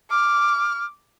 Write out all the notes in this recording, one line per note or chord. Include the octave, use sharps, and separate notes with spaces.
D6 F6